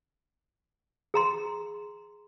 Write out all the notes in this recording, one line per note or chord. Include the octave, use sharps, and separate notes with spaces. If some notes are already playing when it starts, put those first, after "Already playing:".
G#4 A#5 C6